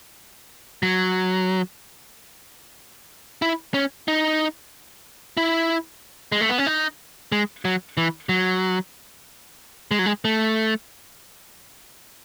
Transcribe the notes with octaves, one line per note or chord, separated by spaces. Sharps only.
F#3
E4
C#4
D#4
E4
G#3
A3
B3
C#4
D#4
G#3
F#3
E3
F#3
G#3
F#3
G#3
A3